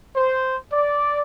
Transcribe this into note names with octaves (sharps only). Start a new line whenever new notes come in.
C5
D5